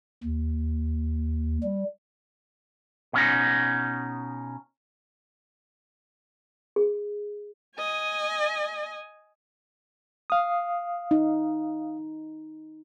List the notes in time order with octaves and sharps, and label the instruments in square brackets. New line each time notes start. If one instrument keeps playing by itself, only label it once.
[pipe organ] D#2
G3
[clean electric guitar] B2 C#4 D#4
[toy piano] G#4
[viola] D#5 G#5
[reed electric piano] F5 D#6
[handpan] D#4